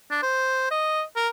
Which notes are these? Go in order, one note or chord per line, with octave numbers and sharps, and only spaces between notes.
D4
C5
D#5
A#4